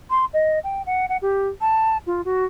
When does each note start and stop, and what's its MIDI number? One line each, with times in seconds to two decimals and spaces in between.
0.10 0.25 84
0.33 0.59 75
0.63 0.81 79
0.86 1.05 78
1.09 1.17 78
1.22 1.48 67
1.61 1.97 81
2.06 2.21 65
2.24 2.45 66